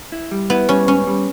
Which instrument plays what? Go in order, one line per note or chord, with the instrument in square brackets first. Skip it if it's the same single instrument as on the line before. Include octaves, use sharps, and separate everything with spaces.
[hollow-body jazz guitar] E4
G3
[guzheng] B3 [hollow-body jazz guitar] E4
[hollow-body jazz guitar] G3 [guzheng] C#4
[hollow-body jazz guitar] G#2 [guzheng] C#4
[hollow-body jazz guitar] G3